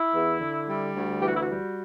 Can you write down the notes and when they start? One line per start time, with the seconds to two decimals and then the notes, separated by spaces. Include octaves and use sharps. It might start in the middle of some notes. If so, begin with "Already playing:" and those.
Already playing: E4
0.12 E2
0.39 D3
0.67 G3
0.94 D2
1.21 E3 G4
1.28 F#4
1.36 E4
1.43 F#4
1.48 G3